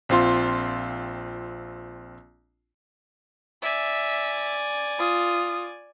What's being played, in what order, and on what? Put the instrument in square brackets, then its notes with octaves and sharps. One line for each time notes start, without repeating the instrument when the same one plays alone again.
[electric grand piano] A#1 C4 F4 C6
[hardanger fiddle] D5 G#5 [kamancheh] E5
[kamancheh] F4 D#6